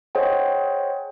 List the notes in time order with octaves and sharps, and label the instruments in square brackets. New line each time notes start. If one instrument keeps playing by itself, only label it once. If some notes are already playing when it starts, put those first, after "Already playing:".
[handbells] G#4 C5 C#5 D#5 F#5 G5